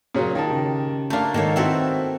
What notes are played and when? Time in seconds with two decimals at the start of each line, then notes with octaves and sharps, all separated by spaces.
0.15 A#2 C#3 F#3
0.35 D#3 F4 A5
0.50 C#3 G4
1.10 A3 A#3 D4 F5
1.34 G#2 D#3 A#3 A4 C#5 F5
1.56 A#3 C4 E4 F#4 A4 B4 C5 E5